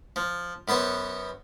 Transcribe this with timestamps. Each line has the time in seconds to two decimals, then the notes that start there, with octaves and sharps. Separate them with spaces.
0.16 F3
0.68 F#2 B3 C5 F#5